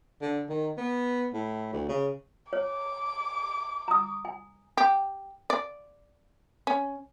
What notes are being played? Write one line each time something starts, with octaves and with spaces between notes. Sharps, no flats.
D3
D#3
B3
A2
D2
C#3
C#5 D6
A#5 D#6
G#5
G4
D5
C#4